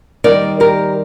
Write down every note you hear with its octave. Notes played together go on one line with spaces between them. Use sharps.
D#3 G3 C4 D#4 A#4 D5
G4 A#4